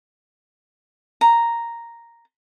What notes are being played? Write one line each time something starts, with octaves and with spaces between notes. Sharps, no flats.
A#5